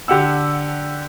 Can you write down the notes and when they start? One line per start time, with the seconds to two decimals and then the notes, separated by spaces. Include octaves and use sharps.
0.08 D3 G4 F#5 E6